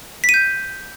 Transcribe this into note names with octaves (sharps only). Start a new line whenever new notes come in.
B6
D#7
G6